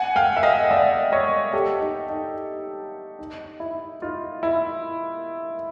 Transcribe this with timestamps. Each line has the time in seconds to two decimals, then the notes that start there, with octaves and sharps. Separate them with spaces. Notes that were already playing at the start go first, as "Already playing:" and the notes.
Already playing: F#5 G#5
0.16 F5 G5
0.37 E5
0.43 D#5 F5
0.71 D5 E5
1.12 C#5 D#5
1.53 G4 A4
1.81 D#4
2.09 D#4
3.19 D#4
3.60 E4
4.02 D#4 F4
4.43 E4